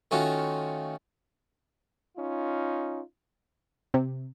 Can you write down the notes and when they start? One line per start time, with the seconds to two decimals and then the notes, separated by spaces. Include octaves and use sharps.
0.11 D#3 A3 C#4 F4 F#4
2.17 C#4 D#4 F4
3.94 C3